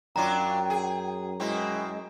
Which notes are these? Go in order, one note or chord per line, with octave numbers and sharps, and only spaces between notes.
F#2 F#3 D4 F4 G5 A#5
G#4
B2 G#3 C4 E4